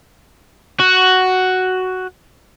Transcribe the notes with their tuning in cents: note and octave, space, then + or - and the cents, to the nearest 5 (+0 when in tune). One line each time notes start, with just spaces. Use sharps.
F#4 +5